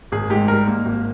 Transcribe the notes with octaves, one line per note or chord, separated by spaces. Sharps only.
G#1 G#4
G#2 G4
G3 A#4
A#3
G#1